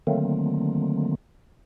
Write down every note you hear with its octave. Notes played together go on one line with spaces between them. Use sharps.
D3 D#3 F#3 A3 A#3 C4